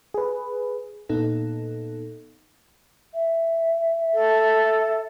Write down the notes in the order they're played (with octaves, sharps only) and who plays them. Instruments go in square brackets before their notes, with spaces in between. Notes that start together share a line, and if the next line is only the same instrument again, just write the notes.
[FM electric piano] G#4 B4
A#2 B3 D#4 A4
[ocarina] E5
[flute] A4